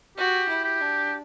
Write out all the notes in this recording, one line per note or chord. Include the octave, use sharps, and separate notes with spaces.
F#4 G4
E4
G4
D4